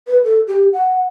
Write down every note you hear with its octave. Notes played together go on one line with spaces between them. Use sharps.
B4
A4
G4
F#5